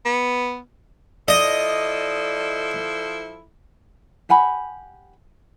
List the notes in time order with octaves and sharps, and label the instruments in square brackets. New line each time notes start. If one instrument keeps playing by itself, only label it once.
[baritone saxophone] B3
[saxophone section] F3 E4 A4 [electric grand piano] D5 [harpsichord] D#5
[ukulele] G4 F#5 G#5 B5